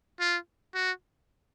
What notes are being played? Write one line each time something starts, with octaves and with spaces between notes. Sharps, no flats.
F4
F#4